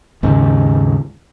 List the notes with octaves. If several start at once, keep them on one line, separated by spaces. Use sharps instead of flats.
D#2 G#2 C#3